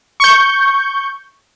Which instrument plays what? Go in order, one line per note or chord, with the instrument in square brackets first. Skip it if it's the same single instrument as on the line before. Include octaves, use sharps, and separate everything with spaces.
[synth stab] C#6 G6